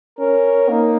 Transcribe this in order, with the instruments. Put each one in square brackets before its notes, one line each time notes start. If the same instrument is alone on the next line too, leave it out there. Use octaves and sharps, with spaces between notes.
[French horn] C#4 [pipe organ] A#4
[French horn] A#3 [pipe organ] D#4